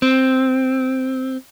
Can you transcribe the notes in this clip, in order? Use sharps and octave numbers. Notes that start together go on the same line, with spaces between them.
C4